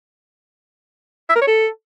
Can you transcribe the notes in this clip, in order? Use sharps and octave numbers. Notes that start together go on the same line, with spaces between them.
E5
A#4
C#5
A4